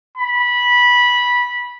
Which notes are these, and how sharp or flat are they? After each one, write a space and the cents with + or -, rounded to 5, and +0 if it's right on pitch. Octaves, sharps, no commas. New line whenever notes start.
B5 -15